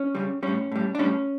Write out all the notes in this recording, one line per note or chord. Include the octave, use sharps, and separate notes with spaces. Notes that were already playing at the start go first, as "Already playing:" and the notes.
Already playing: C#4
C#3 G3
A2 G3 C#4
A2 G3
D4
A2 G3 C#4